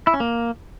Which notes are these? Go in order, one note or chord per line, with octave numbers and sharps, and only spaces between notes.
E4
C#4
A#3